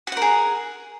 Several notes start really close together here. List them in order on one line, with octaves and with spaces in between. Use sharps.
F#4 F#5 A#4 G#4